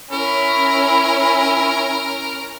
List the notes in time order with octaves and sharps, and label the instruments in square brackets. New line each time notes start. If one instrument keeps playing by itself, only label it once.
[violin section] C#4 [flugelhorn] E4 [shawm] A#4 [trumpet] B5